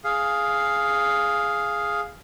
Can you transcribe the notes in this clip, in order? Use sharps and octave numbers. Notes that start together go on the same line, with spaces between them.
G#4 F5